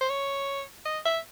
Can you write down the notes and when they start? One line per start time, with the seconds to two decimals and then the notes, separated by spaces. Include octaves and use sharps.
0.01 C5
0.10 C#5
0.86 D#5
1.06 E5